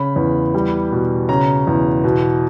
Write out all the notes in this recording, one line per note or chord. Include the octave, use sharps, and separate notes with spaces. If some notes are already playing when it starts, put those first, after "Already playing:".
Already playing: C#3 B5
E2
G3
B2
C#3 A#5
E2
B2